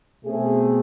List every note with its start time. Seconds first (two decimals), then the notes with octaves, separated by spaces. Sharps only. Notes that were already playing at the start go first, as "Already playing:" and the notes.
0.24 B2 A3 C4 G#4